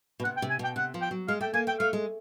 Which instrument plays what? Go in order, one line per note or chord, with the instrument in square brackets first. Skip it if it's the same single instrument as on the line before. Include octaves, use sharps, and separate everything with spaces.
[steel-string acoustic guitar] B2
[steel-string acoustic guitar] C3 [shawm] F#5
[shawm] G5
[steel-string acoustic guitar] C3
[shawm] G#5
[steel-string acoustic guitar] B2 [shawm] G5
[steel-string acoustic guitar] C3 [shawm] F#5
[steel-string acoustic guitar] F3
[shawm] G5
[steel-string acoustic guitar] F#3
[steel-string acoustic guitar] G#3 [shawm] F5
[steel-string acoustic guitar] A3 [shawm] G5
[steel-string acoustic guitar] A#3 [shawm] G#5
[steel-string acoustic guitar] A3 [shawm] G5
[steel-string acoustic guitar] A3 [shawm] F5
[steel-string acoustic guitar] G#3